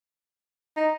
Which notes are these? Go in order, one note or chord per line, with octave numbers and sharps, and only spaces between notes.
D#4